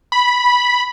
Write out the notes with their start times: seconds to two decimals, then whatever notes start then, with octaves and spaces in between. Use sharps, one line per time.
0.12 B5